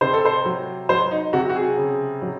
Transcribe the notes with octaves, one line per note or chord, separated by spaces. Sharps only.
C3 C5
A4
C5
F#3
F#3 C5
D#4
C3 F#4
F#4
G#4
C#3
F#3